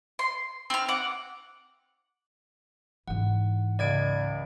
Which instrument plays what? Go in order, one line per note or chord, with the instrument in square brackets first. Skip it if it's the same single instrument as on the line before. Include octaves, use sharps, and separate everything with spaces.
[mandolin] C6
C4 F6
F#5 D6
[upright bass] G#2 E3 [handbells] F#5
[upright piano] C#2 [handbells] D5 G#6 D7